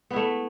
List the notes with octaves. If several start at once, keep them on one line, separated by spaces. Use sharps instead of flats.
A3 B3 E4